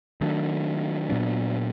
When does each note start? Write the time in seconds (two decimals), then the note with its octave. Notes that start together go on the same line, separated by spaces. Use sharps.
0.21 D#3 F#3 A3 D4
1.10 A#2 F#3 B3 D4